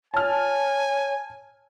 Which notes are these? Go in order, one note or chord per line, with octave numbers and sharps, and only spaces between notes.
C#5 G#5 A5 F6